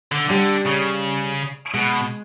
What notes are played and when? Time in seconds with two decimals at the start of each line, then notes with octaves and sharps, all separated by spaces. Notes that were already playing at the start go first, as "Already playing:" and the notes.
0.12 D3
0.29 D3 G3
0.66 C#3
1.73 B2 G#3